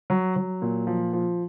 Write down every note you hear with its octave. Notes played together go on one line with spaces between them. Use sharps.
F#3
F#3
A#2
F3
F3